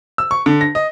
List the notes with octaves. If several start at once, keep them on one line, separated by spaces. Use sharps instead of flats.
E6
C#6
D3
A#6
D#5